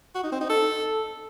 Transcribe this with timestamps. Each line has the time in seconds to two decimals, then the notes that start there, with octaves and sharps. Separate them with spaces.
0.15 F#4
0.24 D#4
0.32 C4
0.41 D#4
0.50 A4